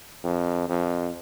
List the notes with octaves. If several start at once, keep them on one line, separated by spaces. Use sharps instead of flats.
F2
F2